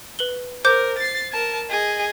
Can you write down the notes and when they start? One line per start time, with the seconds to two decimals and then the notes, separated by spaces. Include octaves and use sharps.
0.19 B4 F#7 G7
0.65 A#4 C5 D6 G6
0.98 A6 C7
1.32 A#4 A5
1.70 G#4 D#5